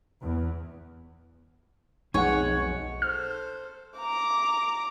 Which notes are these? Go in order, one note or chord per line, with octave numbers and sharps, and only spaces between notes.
E2
B1 F2 G#3 D#4 C#5 F#5 G#5
A4 C5 F6
A#5 D6